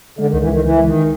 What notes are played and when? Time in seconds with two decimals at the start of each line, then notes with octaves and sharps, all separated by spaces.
0.19 D3 G#3
0.30 D#3
0.33 C#2
0.41 E3
0.49 C#2 D#3
0.64 C#2 E3
0.80 G#3
0.87 D#3